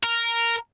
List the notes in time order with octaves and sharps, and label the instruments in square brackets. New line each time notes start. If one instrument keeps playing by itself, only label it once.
[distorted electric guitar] A#4